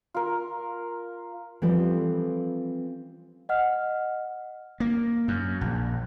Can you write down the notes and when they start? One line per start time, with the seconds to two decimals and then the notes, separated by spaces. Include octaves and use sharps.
0.14 F4 A#4
1.62 E3 F3 G3 C4 A4 B4
3.49 D#5 F#5 F6
4.80 A#3
5.28 F#2
5.61 A#1